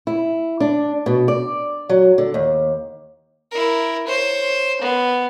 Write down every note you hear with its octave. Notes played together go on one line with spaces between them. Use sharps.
E4
D4
B2
D5
F#3
D3
D#2
E4 A#4
C5 C#5
B3